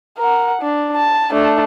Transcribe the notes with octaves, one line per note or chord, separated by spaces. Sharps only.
A#4 F#5
D4
A5
A3 D4